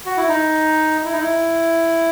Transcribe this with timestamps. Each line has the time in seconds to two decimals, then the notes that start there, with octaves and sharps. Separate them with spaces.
0.06 F#4
0.17 E4
0.29 D#4
1.05 E4
1.12 D#4
1.20 E4